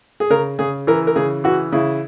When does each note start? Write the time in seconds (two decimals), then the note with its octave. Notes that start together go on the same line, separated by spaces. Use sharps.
0.20 G#4
0.30 C#3 A#4
0.59 C#3 G#4
0.87 E3 A#4
1.07 A#4
1.16 C#3 G#4
1.44 E3 F#4
1.72 C#3 E4